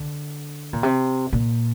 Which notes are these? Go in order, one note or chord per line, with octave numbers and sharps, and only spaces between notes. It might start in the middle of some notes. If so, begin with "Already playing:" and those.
Already playing: D3
A#2
C3
A#2